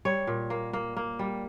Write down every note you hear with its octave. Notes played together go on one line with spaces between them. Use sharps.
G3 C#5
A#2
A#3
A#3
A#3
G3